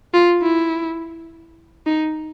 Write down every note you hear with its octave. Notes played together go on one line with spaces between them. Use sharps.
F4
E4
D#4